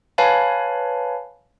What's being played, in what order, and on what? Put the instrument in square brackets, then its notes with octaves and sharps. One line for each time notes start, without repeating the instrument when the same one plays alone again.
[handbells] B4 C#5 F5 G#5 A5 B5